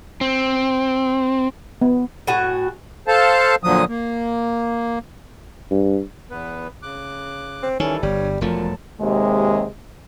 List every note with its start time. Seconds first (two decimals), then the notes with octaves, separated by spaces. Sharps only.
0.21 C4
1.82 B3
2.27 A2 F#4 G#5
3.08 A4 C5 F5 A5
3.64 A#2 D3 F3 F#3 D#6
3.88 A#3
5.71 G2
6.30 E2 B3 B4
6.82 C#3 D6 F#6
7.63 C4
7.80 D#3 E3 G3 C#4 A4
8.03 G1 G2 G3 C#5
8.41 E1 A#2 F3 F#3 A3 A5
9.01 D#2 C3 G#3